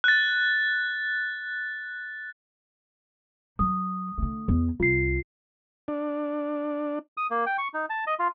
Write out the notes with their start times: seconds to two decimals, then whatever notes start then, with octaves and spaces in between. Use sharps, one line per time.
0.04 F#6 A6
3.59 F#3 D#6
4.18 D3 A3
4.48 E2
4.80 C2 F4 C7
5.88 D4
7.17 D#6
7.31 A#3
7.47 G5
7.58 C#6
7.74 D#4
7.90 A5
8.07 D#5
8.19 F4